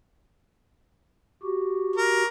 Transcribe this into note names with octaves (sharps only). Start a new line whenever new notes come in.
F#4 G4
A#4